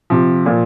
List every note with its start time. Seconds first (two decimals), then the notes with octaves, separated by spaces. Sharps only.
0.10 C3 F3
0.46 A#2 F3